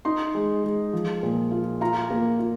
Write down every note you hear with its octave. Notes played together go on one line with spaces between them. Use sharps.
D#4 C6
G#3
G#3
F3
A#2
F4
F4 A#5
A#3
F4